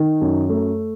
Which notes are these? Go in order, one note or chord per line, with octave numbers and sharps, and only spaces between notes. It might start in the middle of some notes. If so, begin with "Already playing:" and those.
Already playing: D#3
F#2
A3